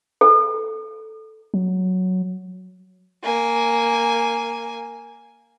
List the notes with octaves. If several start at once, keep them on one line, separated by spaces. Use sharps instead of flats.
A4
F#3
A#3 G#5